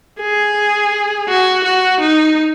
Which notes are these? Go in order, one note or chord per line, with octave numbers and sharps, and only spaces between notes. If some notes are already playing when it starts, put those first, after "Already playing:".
G#4
F#4
F#4
D#4